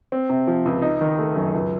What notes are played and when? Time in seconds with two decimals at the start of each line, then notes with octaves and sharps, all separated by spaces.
0.12 C4
0.30 C3
0.47 F3
0.65 C#2
0.82 D#4
1.01 D#3
1.18 A3
1.36 F#2
1.54 C#2